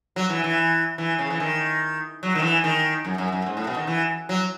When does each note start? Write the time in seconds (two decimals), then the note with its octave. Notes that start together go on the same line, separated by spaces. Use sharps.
0.16 F#3
0.30 E3
0.44 E3
0.98 E3
1.19 C#3
1.30 E3
1.40 D#3
2.23 F#3
2.35 D#3
2.42 E3
2.64 D#3
3.05 F#2
3.18 F#2
3.32 F#2
3.46 G#2
3.57 A2
3.67 B2
3.76 D#3
3.87 E3
4.29 F#3